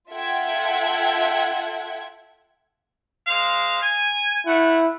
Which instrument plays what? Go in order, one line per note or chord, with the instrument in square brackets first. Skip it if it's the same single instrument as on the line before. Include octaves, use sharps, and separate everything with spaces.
[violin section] F4 A4 E5 F#5 G5 G#6
[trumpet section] G#3 C5 F5
G#5
[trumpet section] A3 F#5 [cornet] E4